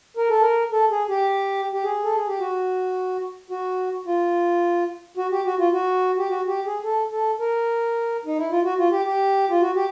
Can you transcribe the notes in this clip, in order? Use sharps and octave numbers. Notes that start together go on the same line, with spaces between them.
A#4
A4
A#4
A4
G#4
G4
G4
G#4
A4
G#4
G4
F#4
F#4
F4
F#4
G4
F#4
F4
F#4
G4
F#4
G4
G#4
A4
A4
A#4
D#4
E4
F4
F#4
F4
G4
G4
F4
F#4
G4